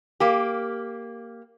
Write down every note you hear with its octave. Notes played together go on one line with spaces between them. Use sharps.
A#3 G4